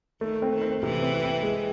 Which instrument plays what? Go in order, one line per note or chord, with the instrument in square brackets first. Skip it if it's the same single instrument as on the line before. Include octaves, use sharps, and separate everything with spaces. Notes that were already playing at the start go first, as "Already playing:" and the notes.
[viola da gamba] D#3 [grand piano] A3
[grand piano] C4
[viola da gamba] D#3
[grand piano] C4
[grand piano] C3 [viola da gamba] E3
[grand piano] C4
C4
G#3